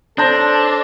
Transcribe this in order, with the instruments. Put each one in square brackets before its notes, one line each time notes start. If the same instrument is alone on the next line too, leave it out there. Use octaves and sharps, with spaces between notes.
[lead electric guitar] D4 [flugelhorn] A4 [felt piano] C5 A5 G6 [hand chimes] C#5 C6 A#6